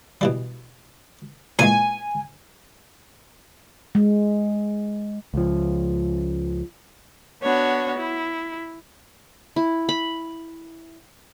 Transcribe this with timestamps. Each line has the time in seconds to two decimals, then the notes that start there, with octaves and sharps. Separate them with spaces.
0.21 B2 E3 G3
1.59 A#2 E3 G#3 G#5
3.95 G#3
5.34 C#2 F3
7.42 B3 D4 F#4 C#5
7.97 E4
9.56 E4
9.89 B5